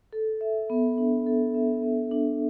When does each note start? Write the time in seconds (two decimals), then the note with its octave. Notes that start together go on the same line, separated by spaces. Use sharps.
0.13 A4
0.41 E5
0.70 B3
0.98 D4
1.26 A4
1.55 E5
1.83 B3
2.11 D4